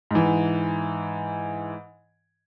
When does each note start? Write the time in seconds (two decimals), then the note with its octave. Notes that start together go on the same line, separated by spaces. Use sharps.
0.11 G#2 E3